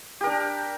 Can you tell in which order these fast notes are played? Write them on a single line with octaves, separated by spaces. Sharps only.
G4 A#4 D4